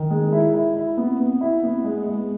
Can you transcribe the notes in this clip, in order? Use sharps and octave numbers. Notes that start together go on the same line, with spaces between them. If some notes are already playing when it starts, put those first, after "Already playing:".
Already playing: D#3
G#3
E4
E4
E4
B3
B3
E4
B3
G#3
G#3